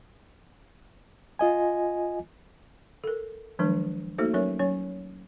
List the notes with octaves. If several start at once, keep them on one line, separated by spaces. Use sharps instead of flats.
F4 D#5 G#5
A4 A#4
D#3 F3 F#3 G#3 D4
A3 A#3 D#4 F#4 A4 C5
F#3 C#4 A#4 C#5 E5
F#3 C#4 C#5